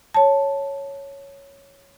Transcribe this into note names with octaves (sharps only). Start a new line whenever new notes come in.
C#5 A5